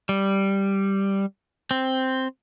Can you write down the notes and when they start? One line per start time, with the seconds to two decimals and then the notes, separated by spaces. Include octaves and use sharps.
0.09 G3
1.71 C4